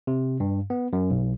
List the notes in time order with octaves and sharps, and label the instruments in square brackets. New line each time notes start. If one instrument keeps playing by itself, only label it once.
[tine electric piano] C3
G2
B3
F#2
B1